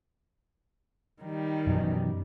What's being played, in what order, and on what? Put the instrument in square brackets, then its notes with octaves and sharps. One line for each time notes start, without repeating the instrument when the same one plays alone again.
[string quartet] D#3 G3
[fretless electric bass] F#2 B2 E3